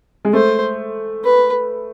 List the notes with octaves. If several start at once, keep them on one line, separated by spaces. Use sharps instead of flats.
G#3
A3 C5
B4